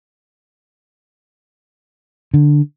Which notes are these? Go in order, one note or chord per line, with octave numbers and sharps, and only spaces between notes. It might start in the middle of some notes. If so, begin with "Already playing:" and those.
D3